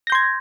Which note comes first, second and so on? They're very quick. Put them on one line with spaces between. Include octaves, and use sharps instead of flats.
A#6 G6 C6 G#6